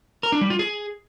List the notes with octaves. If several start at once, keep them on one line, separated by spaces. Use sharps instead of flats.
A#4
D4
G3
F4
G#4